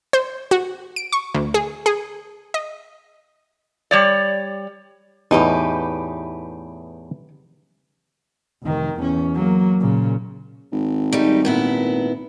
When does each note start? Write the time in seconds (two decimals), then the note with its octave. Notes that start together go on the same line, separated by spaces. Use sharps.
0.13 C5
0.51 F#4
0.96 D7
1.12 C#6
1.34 D2
1.54 G#4
1.86 G#4
2.54 D#5
3.91 G3 C#5 D5
5.31 E2 A2 D#4 G4 B4
8.64 F1 D#3
8.98 E2 C#4
9.34 F#3 A#3
9.79 A#2 C#3
10.72 G#1
11.12 G3 A3 D#4
11.45 A#2 B3 E4